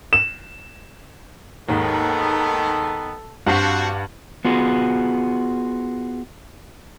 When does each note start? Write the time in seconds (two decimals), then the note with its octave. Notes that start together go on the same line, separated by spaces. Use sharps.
0.13 E7
1.69 D#2 G#2 D#3 B3 A4
3.46 G2 C4 F#4 G4 F5 F#5 A5 B6
4.45 B3 F4 F#4 G#4